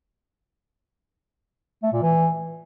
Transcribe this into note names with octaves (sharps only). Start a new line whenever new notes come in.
A3
A#2
E3